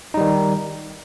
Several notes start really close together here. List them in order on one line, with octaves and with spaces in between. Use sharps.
D#4 G3 D#3